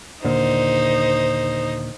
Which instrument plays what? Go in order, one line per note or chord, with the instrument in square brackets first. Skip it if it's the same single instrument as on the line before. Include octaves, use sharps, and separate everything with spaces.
[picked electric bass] D#2 A#2 D3 [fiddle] D#4 C5